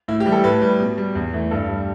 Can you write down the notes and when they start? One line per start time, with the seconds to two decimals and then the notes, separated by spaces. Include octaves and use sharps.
0.08 A2 E4
0.20 G4
0.26 E3 G3
0.32 A4
0.44 A2 B4
0.62 G3
0.80 B2
0.98 G3
1.15 E2
1.33 E3 A3
1.51 G2 A4
1.69 G3